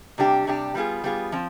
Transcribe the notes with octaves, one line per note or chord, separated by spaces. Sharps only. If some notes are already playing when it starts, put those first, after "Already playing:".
C3 G3 D4 G4
C3 G3 D4 G4
G3 B3 F4 G#4
G3 B3 F4 G#4
F3 C4